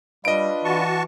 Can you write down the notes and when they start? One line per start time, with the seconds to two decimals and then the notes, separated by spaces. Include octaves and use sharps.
0.25 G3 D4 F4 B4 D#5 D7
0.65 E3 F#4 A5 C#6